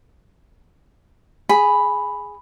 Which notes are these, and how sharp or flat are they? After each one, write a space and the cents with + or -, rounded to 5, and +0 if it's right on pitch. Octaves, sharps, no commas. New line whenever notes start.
G#4 +0 B5 +0